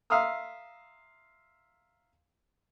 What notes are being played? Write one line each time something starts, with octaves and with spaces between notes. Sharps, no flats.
E5 F5 A#5 C6 D#6 E6